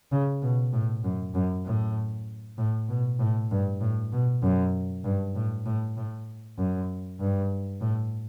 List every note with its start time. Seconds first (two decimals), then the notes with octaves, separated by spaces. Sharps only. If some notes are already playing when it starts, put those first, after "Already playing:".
0.11 C#3
0.42 B2
0.73 A2
1.04 F#2
1.34 F#2
1.65 A2
2.58 A2
2.89 B2
3.19 A2
3.51 G2
3.81 A2
4.12 B2
4.43 F#2
5.04 G2
5.35 A2
5.66 A2
5.97 A2
6.58 F#2
7.20 G2
7.81 A2